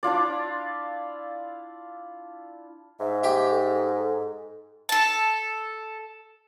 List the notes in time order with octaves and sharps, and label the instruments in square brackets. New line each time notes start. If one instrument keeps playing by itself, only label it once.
[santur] D4 E4 F4 D5
[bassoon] G#2 [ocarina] E5
[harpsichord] G4 [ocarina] E5
[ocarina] A4
[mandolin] A4 A5